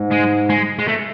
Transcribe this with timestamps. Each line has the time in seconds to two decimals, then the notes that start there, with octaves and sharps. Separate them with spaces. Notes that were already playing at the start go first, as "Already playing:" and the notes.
Already playing: G#2
0.12 G#3
0.50 G#3
0.79 G#3
0.88 A3